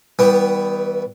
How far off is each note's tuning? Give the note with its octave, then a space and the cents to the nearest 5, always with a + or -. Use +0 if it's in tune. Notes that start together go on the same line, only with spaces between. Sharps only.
E3 -40 G3 +0 B3 +5